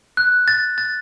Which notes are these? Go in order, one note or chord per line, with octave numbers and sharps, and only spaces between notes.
F#6
A6
A6